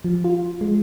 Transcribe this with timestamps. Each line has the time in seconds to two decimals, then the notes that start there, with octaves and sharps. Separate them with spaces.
0.04 F3
0.24 F4
0.61 G#3